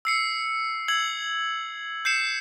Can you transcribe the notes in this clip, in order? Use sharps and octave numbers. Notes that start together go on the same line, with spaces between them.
E6 C7 C#7
E6 G#6 F#7
G6 C7 C#7 E7